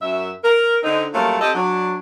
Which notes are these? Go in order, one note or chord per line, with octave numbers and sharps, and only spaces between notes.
F#2 E5
A#4
D3 C4 D#4
F#3 G3 A3 A#3 C#4 F4
C4 G4 A4 D#5
F#3 D4